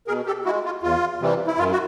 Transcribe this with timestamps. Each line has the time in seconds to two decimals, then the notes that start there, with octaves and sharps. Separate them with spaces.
0.07 B2 G#4 A#4
0.26 G4 A4
0.45 G#3 E4 F#4
0.65 F4
0.82 E2 F4
1.21 C3 E3 G3
1.47 E4
1.58 F#2 F4
1.72 F#4